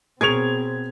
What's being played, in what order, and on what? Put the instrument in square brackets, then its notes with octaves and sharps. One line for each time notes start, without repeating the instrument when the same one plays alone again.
[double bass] B2 C4 [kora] G#4 A#4 C#5 [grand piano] G#6 F7